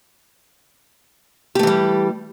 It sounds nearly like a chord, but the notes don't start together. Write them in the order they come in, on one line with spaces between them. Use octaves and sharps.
G4 A3 E3 G3